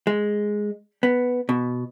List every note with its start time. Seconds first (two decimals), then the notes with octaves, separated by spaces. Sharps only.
0.07 G#3
1.03 B3
1.49 B2